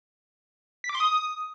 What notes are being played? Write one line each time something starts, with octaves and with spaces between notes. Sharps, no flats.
B6
D6
C6
D#6